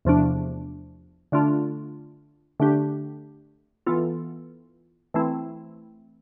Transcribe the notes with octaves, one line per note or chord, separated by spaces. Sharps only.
E2 C3 F3 A3 D4
D3 A3 D4 F4
D3 A3 D4 G4
E3 B3 F4 A4
E3 A3 C4 E4